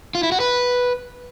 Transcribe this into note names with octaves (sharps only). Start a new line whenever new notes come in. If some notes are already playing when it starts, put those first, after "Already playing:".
F4
E4
F#4
B4